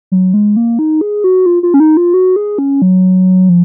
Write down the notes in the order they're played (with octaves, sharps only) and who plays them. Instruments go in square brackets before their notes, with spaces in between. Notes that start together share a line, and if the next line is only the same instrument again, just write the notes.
[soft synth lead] F#3
G#3
A#3
D#4
G#4
F#4
F4
F4
C#4
D#4
F4
F#4
G#4
C#4
F#3
F3